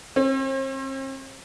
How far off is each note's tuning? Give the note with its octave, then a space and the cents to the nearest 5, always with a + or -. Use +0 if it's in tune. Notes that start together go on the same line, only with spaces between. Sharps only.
C4 +40